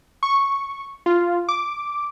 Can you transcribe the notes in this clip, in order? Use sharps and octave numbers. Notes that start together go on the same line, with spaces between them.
C#6
F4
D6